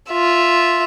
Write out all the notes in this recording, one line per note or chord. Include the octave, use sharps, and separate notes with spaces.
F4 E5